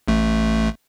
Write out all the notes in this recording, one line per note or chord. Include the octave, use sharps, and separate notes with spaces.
A1 A3